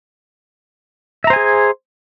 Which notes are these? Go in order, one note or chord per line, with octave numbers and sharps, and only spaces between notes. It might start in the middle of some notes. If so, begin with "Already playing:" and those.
G#4 C5 E5 G#5 A#5